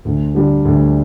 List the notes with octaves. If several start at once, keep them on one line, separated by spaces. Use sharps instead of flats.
D2
D3 G3
D2